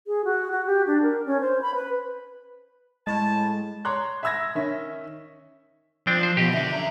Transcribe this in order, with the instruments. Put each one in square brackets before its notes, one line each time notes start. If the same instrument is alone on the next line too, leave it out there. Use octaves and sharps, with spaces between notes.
[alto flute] G#4
F#4
F#4
G4
D4
A#4
C#4
C5
B5
B4
[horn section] A2 A5 [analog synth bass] G#3
[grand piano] C#5 A#5 C6 D6 F#6
E5 B5 E6 G#6 A#6
D#3 C#4 E5
[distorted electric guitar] F3 [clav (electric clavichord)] C4 D4 G5
[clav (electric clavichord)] C5
[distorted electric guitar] B2 [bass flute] F3 [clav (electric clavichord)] G4 D#5
[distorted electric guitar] D3 [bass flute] E5
[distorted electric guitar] F#2 A#5